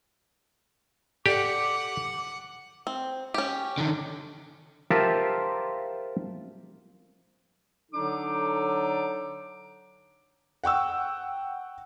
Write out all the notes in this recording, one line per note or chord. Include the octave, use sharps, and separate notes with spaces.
G4 A4 D5 F#5 D6
C4
C#4 G4
D3 D#3
F4 G4 A#4 C5 E5 A5
D3 F#3 D4 D#4 A4 D6
F#5 G5 C#6 E6